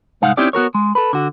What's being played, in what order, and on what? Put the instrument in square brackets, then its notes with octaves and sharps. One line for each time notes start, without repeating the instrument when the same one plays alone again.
[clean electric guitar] C2 G#2 G#3 D#4 F5 F#5
C4 C#4 D#4 E4 G4 D5
B3 F#4 A#4 C#5
G#3
A4 B4
D3 F#4